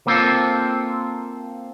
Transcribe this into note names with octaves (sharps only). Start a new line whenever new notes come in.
A#3 C4 F4 A4